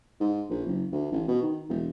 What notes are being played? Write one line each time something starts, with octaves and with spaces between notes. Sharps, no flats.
G#2
A#1
F#1
D2
A1
B2
D#3
E1